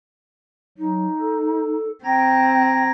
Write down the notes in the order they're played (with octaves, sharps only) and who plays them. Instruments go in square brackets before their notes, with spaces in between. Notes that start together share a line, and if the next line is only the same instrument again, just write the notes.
[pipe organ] F#3 [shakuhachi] D#4
[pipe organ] A4
[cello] C4 [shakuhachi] G5 [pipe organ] A#5 G#6 A#6